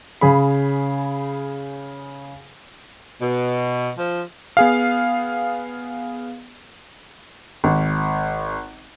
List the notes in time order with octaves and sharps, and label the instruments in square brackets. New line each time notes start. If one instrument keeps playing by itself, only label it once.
[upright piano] C#3 G#4 B5
[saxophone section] B2
F3
[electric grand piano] B3 G#4 F5
[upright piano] G#1